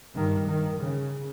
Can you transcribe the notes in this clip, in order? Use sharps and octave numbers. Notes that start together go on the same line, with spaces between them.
G2 D#3
D#3
C#3